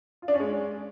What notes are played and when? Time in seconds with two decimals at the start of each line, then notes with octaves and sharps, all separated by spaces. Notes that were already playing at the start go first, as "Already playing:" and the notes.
0.22 F4
0.28 D4
0.34 C#4
0.40 G#3